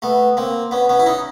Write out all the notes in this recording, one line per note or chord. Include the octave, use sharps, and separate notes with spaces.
A3 B3
A#3 C4
B3 C#4
B3 C#4
E4
C#4 D#4